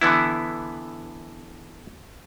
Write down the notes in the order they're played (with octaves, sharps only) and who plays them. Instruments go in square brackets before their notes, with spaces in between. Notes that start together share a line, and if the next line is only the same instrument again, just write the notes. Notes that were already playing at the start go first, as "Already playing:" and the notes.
[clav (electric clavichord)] D3 E3 B3 E4